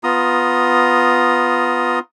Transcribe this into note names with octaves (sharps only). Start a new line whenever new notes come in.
B3 F4 A#5 D#6